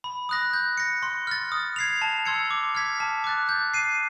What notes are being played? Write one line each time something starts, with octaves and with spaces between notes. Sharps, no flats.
B5
D#6 F#6 A#6
G6
A#6 C#7
C6
F6 A6
D#6
G#6 C7 F7
A5
C6 E6 G#6 C#7
D6
F6 G#6 B6
A5
D6 F#6 A6
G6
C7 D#7